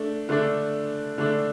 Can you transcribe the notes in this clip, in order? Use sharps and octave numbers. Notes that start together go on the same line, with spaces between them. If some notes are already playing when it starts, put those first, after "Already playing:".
Already playing: A3 D4
D3 A3 D4
D3 A3 D4